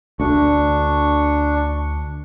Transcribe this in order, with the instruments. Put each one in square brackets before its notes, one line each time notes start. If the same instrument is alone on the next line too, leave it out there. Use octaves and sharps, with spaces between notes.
[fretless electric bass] D2 D3 [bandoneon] D4 C#6